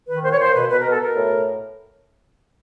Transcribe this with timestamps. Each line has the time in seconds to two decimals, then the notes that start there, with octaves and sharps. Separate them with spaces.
0.08 D#3 B4
0.24 A#2 C5
0.33 C#5
0.40 A#2 C5
0.55 B2 B4
0.70 B2 B4
0.81 B2 A#4
0.92 A4
1.02 B2 A#4
1.17 A2